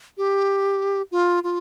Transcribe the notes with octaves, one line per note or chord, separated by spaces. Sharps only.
G4
F4
F4